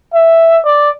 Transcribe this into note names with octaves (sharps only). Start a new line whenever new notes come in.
E5
D5